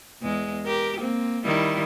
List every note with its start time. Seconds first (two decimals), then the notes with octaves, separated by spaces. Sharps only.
0.22 E2 G#3
0.66 G4 A#4
0.99 A#3 C4
1.45 D#3 G3 E4